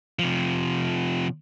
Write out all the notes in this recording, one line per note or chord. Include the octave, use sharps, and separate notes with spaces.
C3 F3